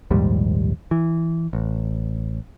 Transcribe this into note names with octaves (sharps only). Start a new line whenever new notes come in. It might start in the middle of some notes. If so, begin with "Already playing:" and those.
A#1 D#2 G#2 G3
E3
A1